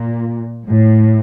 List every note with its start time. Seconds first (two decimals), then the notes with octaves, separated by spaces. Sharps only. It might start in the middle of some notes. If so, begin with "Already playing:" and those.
Already playing: A#2
0.67 A2